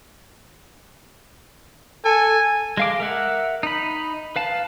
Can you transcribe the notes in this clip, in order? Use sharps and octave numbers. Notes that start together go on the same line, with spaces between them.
A4 G#5
G#3 F5 D6
A#4 E5 F#5
D#4 B5
B4 F5 A5